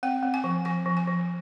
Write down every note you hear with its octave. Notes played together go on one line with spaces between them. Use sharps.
C4 G5
C4
G#5
F3
F3 G#5
F3
G#5
F3